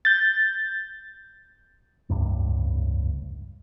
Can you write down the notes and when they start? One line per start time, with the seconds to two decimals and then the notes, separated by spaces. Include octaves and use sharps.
0.05 G6 A6
2.10 F1 C#2 G2